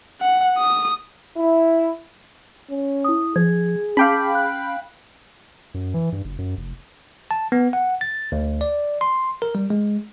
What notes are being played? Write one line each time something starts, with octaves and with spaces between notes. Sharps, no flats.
F#5
D#6
E4
C#4
E4 D#6
F3 G#4 G#6
C#4 F5 G5 A5 B5 D6
F#6
F#2
E3
G2
F#1
F#2
F1
A5
B3
F#5
A6
D2
D5
C6
A#4
G3
G#3